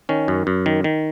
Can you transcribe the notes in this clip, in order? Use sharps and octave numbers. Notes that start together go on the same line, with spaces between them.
D#3 C#4
F#2
F#2
D#3
D#3